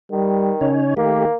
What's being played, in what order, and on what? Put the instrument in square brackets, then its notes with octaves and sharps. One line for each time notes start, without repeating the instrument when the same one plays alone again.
[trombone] D#3 [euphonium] G3
[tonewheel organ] C#3 D#4 C#5 [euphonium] C#4
[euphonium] D#3 [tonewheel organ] A3 G4 [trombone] A#3